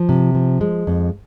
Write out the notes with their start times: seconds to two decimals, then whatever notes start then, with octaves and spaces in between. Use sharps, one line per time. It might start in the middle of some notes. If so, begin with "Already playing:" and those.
Already playing: F3
0.09 C3
0.35 F3
0.61 G#3
0.87 F2